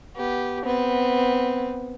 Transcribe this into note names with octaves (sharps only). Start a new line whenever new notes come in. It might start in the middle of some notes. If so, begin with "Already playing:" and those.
B3 G4
B3 C4